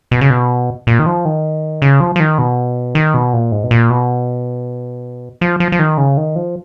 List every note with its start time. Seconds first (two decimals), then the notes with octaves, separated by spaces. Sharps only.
0.11 B2
0.21 C#3
0.30 B2
0.87 A#2
0.99 D#3
1.06 F3
1.25 D#3
1.82 C#3
2.00 F3
2.16 F3
2.20 D#3
2.39 B2
2.95 D#3
3.14 B2
3.33 A#2
3.52 G#2
3.64 B2
3.71 A#2
3.90 B2
5.41 F3
5.60 F3
5.72 F3
5.79 D#3
5.98 C#3
6.17 D#3
6.36 F3